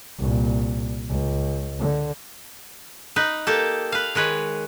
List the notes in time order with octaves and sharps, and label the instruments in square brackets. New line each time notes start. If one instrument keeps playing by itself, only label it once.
[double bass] C2 A#2
C#2
D3
[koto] D#4 B4
A#3 G4 A4
B4 F5
D#3 G#3 B4 C#5